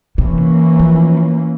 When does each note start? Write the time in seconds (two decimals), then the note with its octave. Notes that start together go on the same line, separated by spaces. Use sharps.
0.18 C3 E3 A#3 C#4
0.79 F3